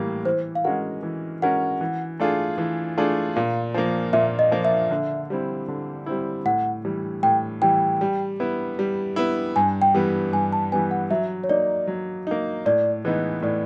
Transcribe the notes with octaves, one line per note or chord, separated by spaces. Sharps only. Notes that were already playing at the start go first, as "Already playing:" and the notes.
Already playing: A2 E3 G3 A#3
E3 C5
F5
G#3 C#4 F#4 A#4 F#5
E3
G#3 C#4 F#4 A#4 F#5
E3
A3 D4 F4 G#4
E3
A3 D4 F4 G#4
A#2 F5
F3 A#3
A#2 E5
D#5
F3 A#3
E5
D3
G3 C4 E4
D3
G3 C4 E4
A2 F#5
E3 G3
A2 G5
E3 G3 G5
G3
B3 E4
G3
B3 E4
G2 G#5
G5
E3 G3 B3
G2 G#5
A5
E3 G3 B3 G#5
F#5
F#3 E5
C#5
A#3 D#4 D5
F#3
A#3 D#4
A2 D5
E3 G#3 B3 D#4
A2 D5